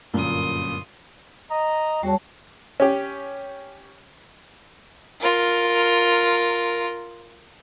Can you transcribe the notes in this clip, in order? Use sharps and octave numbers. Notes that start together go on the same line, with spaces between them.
G1 F#2 A#2 C6 D#6
D#5 A#5
E2 G3 F#4 C#5 A5
C#4 G4
F4 A#4